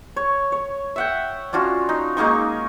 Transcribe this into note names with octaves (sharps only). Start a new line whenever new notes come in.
C#5
C#5
E5 F#5 G5
C#4 D4 F4 F#4
D#4
G#3 A#3 D#4 C#6